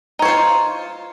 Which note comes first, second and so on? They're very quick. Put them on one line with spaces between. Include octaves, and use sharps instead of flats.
D#4 C#5 C5 F4